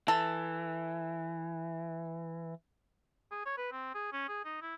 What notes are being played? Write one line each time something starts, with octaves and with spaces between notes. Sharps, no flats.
E3 A4
G#4
C#5
B4
C4
G#4
C#4
G#4
D#4
E4